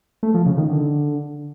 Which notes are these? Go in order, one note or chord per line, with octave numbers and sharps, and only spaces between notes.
A3
F3
C#3
D#3
D3